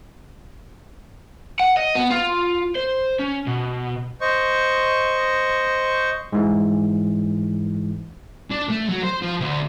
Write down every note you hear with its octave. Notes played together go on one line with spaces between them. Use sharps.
F#5
D#5
B3
F4
C5
C#4
B2
C5 D#5 C#6
G#2 E3 G#3
D4
A3
F#3
C5
F3
D2